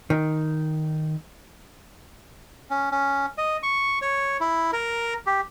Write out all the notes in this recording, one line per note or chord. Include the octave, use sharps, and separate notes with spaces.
D#3
C#4
C#4
D#5
C#6
C#5
E4
A#4
G4